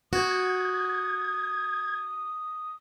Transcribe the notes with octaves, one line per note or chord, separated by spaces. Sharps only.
F#4 D#6 G#6